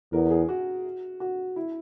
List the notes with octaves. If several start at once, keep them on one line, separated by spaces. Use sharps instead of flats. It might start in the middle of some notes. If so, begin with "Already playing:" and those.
E2 A#4
G#4
F#4
F#4
E4